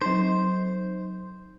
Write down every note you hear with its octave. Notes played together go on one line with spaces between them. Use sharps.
F#3 D#4 C5